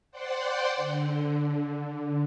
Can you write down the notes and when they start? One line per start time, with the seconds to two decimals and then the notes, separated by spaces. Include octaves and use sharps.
0.11 C5 D5 F#5 G5 C6
0.76 D3